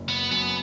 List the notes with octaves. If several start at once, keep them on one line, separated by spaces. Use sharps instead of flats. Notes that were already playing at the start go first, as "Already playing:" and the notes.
Already playing: F#1 F#2
B3
F#2 B3